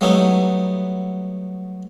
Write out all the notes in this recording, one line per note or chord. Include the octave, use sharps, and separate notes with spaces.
F#3 G3 A3 B3 D#4 E4